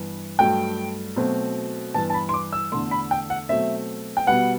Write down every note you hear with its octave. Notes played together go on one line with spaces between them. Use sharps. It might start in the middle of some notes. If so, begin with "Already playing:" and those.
Already playing: G2 E3 B3
G2 F#3 A3 G5
B2 F#3 A3 C4
G2 E3 B3 A5
A5
B5
C6
D6
E6
E2 D3 A3 C6
B5
G5
F#5
B2 F#3 A3 C4 E5
G5
B2 G3 B3 F#5